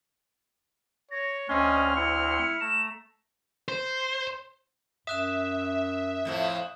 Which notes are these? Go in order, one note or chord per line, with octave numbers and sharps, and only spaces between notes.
C#5 A#6
D2 C4 C#4 D#5 C6 F6
E4 C#7
A3 A#5 E7
C5
F#2 E5 D#6 F#6 E7
F2 A2 F3